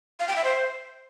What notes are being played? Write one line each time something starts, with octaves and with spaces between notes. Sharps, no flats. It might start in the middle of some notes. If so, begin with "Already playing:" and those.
F5
G5
E5
C5